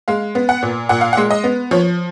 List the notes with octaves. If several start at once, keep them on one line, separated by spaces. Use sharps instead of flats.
G#3 F5
B3
F#5
A#2
A#2 F#5
F5
F#5
G#3
D#5
B3
F3 C#5